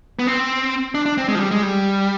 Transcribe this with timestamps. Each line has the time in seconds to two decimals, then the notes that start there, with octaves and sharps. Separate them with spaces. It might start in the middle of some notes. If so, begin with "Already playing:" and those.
0.19 B3
0.27 C4
0.95 D4
1.06 D4
1.17 C4
1.28 G#3
1.35 F3
1.40 G3
1.51 G#3
1.63 G3